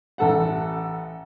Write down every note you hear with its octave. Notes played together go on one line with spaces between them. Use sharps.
A1 A4 F#5